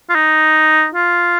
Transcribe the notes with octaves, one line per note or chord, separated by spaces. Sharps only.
F4
D#4
F4